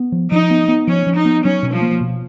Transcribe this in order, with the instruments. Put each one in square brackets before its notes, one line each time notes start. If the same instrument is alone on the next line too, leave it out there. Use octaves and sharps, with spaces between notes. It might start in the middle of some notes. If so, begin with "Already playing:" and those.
Already playing: [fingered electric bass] B3
F3
[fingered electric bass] F3 [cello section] D#4
[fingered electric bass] B3
B3
[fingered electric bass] F3 [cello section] C#4
[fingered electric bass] F3
[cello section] D#4
[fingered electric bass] B3
[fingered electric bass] F#3 [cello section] C#4
[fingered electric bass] B2
[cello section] F3
[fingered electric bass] A#3
B2